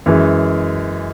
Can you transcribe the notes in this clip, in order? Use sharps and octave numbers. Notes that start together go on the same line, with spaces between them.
F#2 E3 G#3